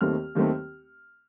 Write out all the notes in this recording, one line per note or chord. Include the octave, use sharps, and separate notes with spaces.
D#2 D#3 A3 C4 F6
D#2 D#3 A3 C4